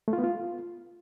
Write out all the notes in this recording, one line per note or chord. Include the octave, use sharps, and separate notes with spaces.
A3
F4
B3
F4